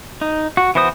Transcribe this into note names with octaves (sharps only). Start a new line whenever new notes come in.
D#4
F#4
E3 B3 F#4 C5 D#6